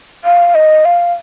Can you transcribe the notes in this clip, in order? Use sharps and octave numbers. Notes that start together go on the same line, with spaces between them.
F5
D#5
F5